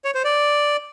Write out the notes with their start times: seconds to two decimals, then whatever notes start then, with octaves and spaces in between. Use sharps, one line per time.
0.05 C#5
0.15 C5
0.24 D5